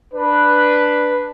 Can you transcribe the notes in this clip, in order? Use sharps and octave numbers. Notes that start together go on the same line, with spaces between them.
D4 B4